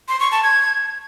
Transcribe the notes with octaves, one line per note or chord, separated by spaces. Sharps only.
C6
C#6
A5
G#6